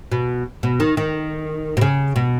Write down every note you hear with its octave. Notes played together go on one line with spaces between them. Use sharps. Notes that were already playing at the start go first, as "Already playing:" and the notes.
B2
B2
D#3
D#3
B2
C#3
B2